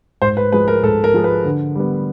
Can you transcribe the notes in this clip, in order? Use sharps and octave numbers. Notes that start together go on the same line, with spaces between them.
G#2 C5
B4
F3 G#3 B4
A#4
G#2 A4
A#4
F3 G#3
B4
D3
G3 B3